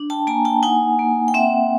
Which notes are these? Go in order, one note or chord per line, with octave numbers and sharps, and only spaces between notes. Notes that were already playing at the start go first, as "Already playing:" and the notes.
Already playing: D4
G5 A5
A#3 G#5 A#5
G5 A5
D#4 F#5 G#5
A#3
G5
C4 E5 F#5